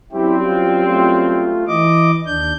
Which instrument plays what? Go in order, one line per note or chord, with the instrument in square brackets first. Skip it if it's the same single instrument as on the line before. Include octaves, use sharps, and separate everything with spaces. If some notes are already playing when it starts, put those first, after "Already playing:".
[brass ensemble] F#2 G3 C4 [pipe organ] E4 G4
[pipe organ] F4
A3 F4
E3 D#5 D6
D#2 D4 G6